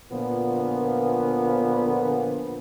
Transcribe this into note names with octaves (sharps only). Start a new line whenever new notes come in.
A#2 D3 F3 B3